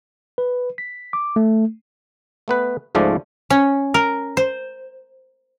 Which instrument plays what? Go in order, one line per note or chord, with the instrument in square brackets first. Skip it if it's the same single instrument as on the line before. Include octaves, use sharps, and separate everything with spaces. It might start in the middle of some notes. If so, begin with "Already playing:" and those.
[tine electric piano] B4
B6
D6
A3
[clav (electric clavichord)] A3 B3 B4
C#2 G#2 F3 G#3 A3 D5
[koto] C#4
A#4
C5